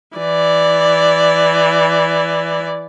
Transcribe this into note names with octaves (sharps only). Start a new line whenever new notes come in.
E3 D5